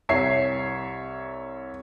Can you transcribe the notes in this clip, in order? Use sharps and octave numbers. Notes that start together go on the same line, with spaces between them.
C2 C#5 E5 C7